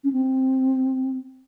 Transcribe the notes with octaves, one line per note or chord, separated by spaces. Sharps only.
C#4
C4